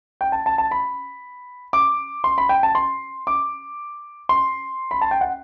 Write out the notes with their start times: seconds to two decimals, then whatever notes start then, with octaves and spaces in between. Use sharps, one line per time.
0.21 G5
0.32 A5
0.46 A5
0.58 A5
0.71 B5
1.73 D6
2.24 C6
2.38 B5
2.49 G5
2.63 A5
2.75 C6
3.27 D6
4.29 C6
4.91 B5
5.01 A5
5.11 G5
5.21 F#5